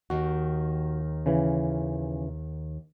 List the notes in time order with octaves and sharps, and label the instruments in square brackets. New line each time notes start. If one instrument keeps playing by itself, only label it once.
[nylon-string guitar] D#2 D#3 [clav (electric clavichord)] F#4
[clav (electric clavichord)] C#3 E3